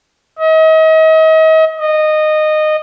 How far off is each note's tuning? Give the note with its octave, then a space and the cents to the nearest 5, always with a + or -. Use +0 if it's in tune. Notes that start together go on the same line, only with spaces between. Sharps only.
D#5 +40
D#5 -15